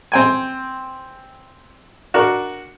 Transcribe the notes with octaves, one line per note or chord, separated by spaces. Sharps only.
C4 G5 G#5
D4 F#4 A#4